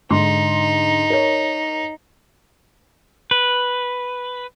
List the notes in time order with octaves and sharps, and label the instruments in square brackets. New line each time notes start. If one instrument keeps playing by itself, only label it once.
[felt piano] G#2 D3 C6 [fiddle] D#4
[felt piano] A#4 C#5
[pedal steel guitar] B4